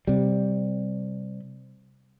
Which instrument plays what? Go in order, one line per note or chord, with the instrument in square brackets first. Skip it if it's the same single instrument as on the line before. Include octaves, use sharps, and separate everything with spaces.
[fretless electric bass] C3 G3